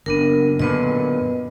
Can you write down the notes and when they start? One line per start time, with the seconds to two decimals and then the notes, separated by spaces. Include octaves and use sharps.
0.06 F#1 B3 D4 A#4
0.60 F#2 A#2 D3 B3 B4 D#5